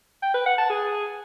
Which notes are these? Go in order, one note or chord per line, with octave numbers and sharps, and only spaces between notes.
G5
B4
F#5
A5
G#4